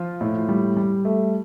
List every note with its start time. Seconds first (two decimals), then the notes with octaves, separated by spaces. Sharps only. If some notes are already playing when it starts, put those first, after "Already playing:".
Already playing: F3 F4
0.21 A2
0.49 G3
0.77 G3
1.05 A3